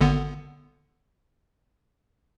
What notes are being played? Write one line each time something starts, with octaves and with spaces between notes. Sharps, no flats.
G#1 D3 B3